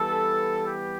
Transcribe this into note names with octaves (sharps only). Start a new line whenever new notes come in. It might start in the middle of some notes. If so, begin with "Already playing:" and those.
Already playing: E3 G3 B3 A4
G4